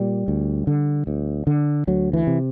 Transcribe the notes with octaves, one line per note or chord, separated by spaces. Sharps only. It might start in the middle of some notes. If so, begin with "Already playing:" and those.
Already playing: A#2 G3
D2
D3
D2
D3
D2 F#3
E3
C3